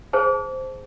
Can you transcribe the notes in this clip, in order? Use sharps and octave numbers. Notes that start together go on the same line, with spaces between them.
G#4 C5 A5